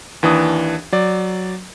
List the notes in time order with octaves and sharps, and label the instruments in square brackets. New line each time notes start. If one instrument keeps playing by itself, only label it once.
[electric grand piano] D#2 E3 D4 D#6
F#3 D5